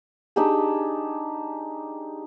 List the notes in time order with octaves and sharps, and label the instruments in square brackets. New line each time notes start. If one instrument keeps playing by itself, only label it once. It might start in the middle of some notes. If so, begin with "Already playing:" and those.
[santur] D4 D#4 G4 G#4